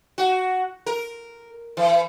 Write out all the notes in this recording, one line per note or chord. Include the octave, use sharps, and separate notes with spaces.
F#4
A#4
E3